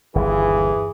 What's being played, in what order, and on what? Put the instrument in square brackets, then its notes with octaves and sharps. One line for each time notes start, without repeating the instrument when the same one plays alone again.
[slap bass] G1 D#2 [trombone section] E3 G#4